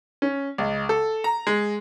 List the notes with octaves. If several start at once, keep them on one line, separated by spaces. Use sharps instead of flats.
C#4
C#2
A4
A#5
G#3